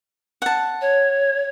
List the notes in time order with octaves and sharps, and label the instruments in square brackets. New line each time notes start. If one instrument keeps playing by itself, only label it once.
[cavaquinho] F#5 A5
[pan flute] C#5